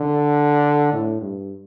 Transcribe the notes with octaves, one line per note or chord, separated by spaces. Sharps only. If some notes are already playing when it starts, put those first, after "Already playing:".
Already playing: D3
A2
G2